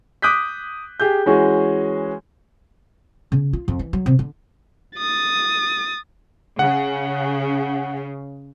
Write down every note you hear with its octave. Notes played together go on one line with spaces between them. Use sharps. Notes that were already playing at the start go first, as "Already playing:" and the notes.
D6 D#6 F#6 G6 B6
G4 G#4 G6
E3 G#3 C#4 F#4 G#4
C#3
F4
F2
E3
F#3
C3
D3
D#6 A6
C#3 F#5